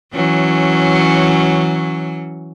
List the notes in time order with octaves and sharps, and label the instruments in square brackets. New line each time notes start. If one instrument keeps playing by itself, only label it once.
[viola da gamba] E3 F#3 C#4